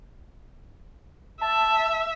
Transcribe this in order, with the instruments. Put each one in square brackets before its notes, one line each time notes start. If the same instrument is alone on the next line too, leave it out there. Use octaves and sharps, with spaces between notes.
[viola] E5 [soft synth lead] A5